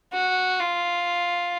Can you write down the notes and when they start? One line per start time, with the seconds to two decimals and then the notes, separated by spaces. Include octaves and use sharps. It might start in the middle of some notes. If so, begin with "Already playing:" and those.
0.13 F#4
0.60 F4